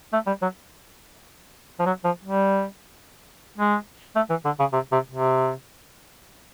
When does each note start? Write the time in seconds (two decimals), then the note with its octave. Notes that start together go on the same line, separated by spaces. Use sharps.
0.13 A3
0.27 G3
0.42 F#3
1.80 F3
1.86 F#3
2.04 F3
2.24 G3
3.58 G#3
4.16 A3
4.30 E3
4.45 D3
4.60 C#3
4.73 C3
4.92 C3
5.12 C3